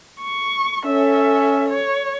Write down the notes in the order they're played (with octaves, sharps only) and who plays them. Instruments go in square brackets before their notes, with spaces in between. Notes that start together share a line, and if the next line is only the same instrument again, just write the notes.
[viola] C#6
[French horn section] C#4 [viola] A4 E5
[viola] C#5